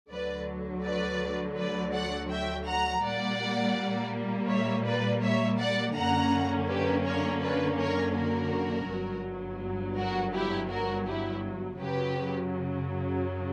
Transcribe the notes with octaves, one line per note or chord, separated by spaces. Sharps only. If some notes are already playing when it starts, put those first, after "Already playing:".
D2 D3 F#3 B4 D5
B4 D5
B4 D5
D5 F#5
E5 G5
F#5 A#5
A#2 G3 A#3 D5 F#5
C#5 E5
B4 D5
C#5 E5
D5 F#5
F#2 D3 A#3 C#4 F#5 A#5
G4 B4
A#4 C#5
B4 D5
A#4 C#5
F#4 A#4
G1 G2 F#3
F#4 A#4
E4 G4
F#4 A#4
E4 G4
F#2 C#3 F#3 G4 B4